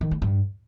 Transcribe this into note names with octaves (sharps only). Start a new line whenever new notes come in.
D#3
G#3
G2